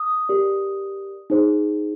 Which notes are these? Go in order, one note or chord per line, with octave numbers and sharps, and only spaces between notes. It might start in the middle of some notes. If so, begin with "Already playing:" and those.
Already playing: D#6
G4 A#4 D5
D#4 G#4 C5